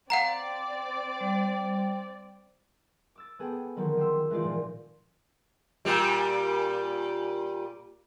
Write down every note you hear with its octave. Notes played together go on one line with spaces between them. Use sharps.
C4 D5 F5 F#5 A#5
G3 C5
D6 E6 A6
B3 G#4 A4 G5
D3 D#3 F3 F#3 A#3
D#5 G5 C6 E6
E3 G#3 C4 D#4 F4 D5
A#2 F3
A#2 G3